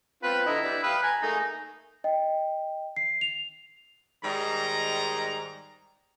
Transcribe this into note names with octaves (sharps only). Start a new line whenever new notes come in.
B3 C4 F4 B4
D3 E4 D#5 A#5
G3 B4 D5
G4 B4 F5 D#6
G#5 A#5
A3 A#3 D#4 G#4
D#5 G5
C7
F7
G#2 D#3 G3 D#5 A#5